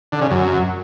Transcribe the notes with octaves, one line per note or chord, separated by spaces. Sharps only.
D3
C#3
F#2